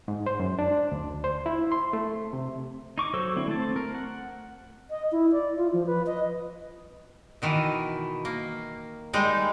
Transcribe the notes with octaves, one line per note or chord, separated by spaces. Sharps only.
G#2
C5
F#2
D4
D2
C5
E4
C6
A3
C3
D#4 C#6 D6
F#3 A4 C5 C#6 E6
D3 C4 E4
A3 C4 A5
A#4
F#5
D#5
E4
D5
F4
F3
B4
D#5
B2 D#3 E3
A#3
G3 G#3 D#4